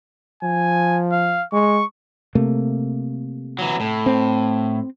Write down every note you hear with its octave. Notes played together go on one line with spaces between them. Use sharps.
F3 G#5
F5
G#3 C#6
C3 A3 A#3
E3 F#3
A2
C4